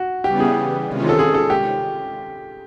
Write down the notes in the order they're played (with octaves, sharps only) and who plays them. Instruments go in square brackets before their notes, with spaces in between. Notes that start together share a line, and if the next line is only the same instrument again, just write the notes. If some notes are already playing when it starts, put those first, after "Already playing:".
Already playing: [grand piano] F#4
[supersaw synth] C#3 E3 G3 B3 [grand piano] G4
[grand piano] G#4
[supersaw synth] C3 D#3 G#3 C#4 F4
[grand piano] A4
G#4
A4
G4